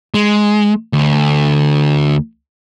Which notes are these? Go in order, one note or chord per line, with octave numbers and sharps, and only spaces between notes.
G#3
D2